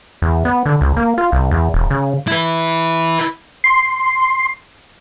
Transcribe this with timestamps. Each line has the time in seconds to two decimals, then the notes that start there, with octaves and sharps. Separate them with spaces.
0.22 E2
0.45 B3
0.66 D3
0.81 C#2
0.97 A#3
1.18 F4
1.32 C2
1.51 E2
1.74 E1
1.90 C#3
2.28 E4 B4
3.64 C6